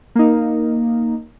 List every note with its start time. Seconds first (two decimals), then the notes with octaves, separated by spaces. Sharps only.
0.15 A#3 D#4